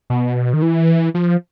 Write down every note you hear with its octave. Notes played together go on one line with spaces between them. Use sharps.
B2
D#3
E3
F3